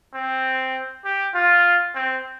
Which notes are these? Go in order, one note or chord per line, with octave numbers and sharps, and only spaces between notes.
C4
G4
F4
C4